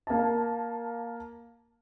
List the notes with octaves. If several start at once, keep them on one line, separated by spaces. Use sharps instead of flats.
A#3 A5